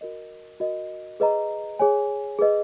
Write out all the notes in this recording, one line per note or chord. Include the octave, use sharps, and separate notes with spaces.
F#4 A#4 D#5
F#4 A#4 D#5
G#4 B4 D#5 A#5
G#4 C#5 G#5
G#4 B4 D#5